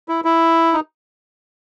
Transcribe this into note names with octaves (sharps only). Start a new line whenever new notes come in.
E4
E4
D#4